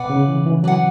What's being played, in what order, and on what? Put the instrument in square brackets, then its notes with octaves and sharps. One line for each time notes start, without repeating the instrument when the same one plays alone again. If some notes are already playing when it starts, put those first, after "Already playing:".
Already playing: [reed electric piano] B2 [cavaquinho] B4 D5 F#5
[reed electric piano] C#3
E3
E3
[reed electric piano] F#3 [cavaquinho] B4 D5 F#5